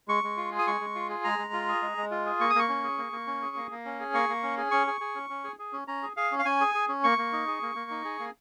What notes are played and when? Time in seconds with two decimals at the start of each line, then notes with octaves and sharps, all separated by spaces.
0.08 G#3 C#6
0.24 G#3
0.37 F4
0.52 G#4
0.59 D#6
0.67 G#3 C#6
0.81 G#3
0.95 F4
1.09 G#4
1.24 G#3 A#5
1.39 G#3
1.53 F4
1.68 G#4
1.82 G#3
1.97 G#3
2.11 F4
2.26 G#4
2.40 A#3 C#6
2.50 D#6
2.55 A#3 C#6
2.69 C#4
2.83 G#4
2.98 A#3
3.12 A#3
3.27 C#4
3.42 G#4
3.56 A#3
3.71 A#3
3.85 C#4
4.00 G#4
4.13 A#3 C#6
4.29 A#3
4.43 C#4
4.57 G#4
4.71 C#4 C#6
4.87 G#4
5.01 G#4
5.15 C#4
5.30 C#4
5.44 G#4
5.59 G#4
5.73 C#4
5.88 C#4 A#5
6.03 G#4
6.17 G#4 F5
6.32 C#4
6.39 F5
6.45 C#4 G#5
6.61 G#4
6.75 G#4
6.88 C#4
7.04 A#3 C#6
7.18 A#3
7.33 D#4
7.47 G#4
7.62 A#3
7.75 A#3
7.91 D#4
8.05 G#4
8.19 A#3